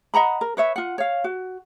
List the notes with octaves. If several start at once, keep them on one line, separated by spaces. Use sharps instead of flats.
D#5 F#5 A#5 B5
A#4
B4 C#5 E5
F4 F#5
C#5 F5
F#4